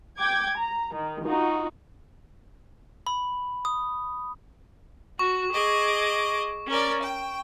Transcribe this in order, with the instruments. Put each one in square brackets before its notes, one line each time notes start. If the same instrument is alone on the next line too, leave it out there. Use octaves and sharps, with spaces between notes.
[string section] G5 D6 G#6
A#5
D#3
D#4 F4 F#4
[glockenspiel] B5
D#6
[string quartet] F#4 [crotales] C#6
[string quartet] G#4 D#5 D6
C#4 A#4 D5
G5